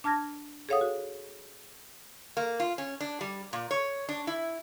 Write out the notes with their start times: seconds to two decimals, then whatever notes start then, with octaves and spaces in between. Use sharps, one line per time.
0.04 D4 A5 F6 G#6 A#6
0.69 G#4 A4 C#5 F5 F#5 D#6
0.81 F#4
2.37 A#3
2.60 F4
2.78 C#4
3.01 D4
3.21 G3
3.53 A#2
3.71 C#5
4.09 D4
4.27 E4